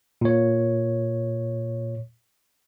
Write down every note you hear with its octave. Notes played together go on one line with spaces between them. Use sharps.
A#2 C#5